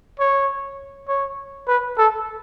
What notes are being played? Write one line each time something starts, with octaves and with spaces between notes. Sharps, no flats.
C#5
C#5
B4
A4